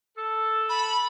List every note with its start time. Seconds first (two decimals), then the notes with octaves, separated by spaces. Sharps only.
0.18 A4
0.69 B5